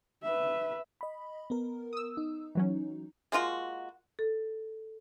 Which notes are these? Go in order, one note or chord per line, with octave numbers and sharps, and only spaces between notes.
B4 E5
D#5 B5
B3 A#4
D#6 E6
D#4
E3 F#3 C#4
G#3 A#3 F4 F#4
A4